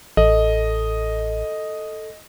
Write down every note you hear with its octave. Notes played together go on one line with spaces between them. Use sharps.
A1 A4 D#5